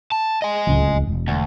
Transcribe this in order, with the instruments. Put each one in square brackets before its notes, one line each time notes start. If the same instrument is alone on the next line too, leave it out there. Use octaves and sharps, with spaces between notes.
[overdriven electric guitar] A5
D#5 G#5
[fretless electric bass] D1 C#2
E1
[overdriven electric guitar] D2